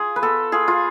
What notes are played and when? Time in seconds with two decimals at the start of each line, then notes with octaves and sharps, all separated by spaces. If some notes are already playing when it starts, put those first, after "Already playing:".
Already playing: F4 G#4
0.16 B4
0.22 B3 A4
0.52 F4 G#4
0.68 F4